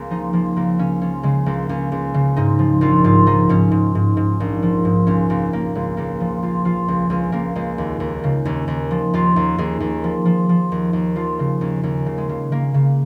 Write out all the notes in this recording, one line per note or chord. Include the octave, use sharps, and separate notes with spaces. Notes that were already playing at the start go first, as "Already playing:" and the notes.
Already playing: C#2 A#3
F3 D#4
F3 A#3
C#2 A#3
C#3 C#4
F3 C#4
C#3 G#3
C#2 A#3
C#2 C#4
C#2
C#3
G#2 D#4
F3
A#1 F4
G#2 F4
F3 D#4
G#2 C#4
G#2
G#2
G#2
A#1
F3
G#2
C#2 C#4
C#2 A#3
C#2 A#3
C#2 G#3
C#2 A#3
F3
C#2 F4
F3 F4
C#2
C#2 C#4
C#2 A#3
C#2 G#3
D#2
D#2
C#3
D#2 C#4
D#2
F3
D#2 F4
D#2
D#2 G#4
D#2
F3
F3
F3
D#2
D#2
F3 F4
C#3
D#2 C#4
D#2 C#4
C#3
G#3
C#3
C#3 A#3
C#3